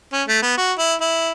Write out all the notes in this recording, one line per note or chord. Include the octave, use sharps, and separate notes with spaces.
C#4
A3
B3
F#4
E4
E4